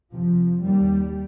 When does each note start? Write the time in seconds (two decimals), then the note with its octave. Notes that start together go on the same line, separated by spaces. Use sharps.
0.12 F2 C3 F3
0.64 D#2 G3